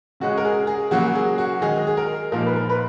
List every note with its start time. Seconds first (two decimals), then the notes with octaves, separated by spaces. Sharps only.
0.20 C#3 G#3 C#4 F#4
0.37 A#4
0.45 G#4
0.67 G#4
0.91 C#3 F#3 A#3 F#4
1.15 G#4
1.38 F#4
1.61 D#3 G#3 D#4 G#4
1.87 G#4
1.97 A#4
2.32 A#2 F3 A#3 D#4 A#4
2.46 B4
2.56 A#4
2.69 B4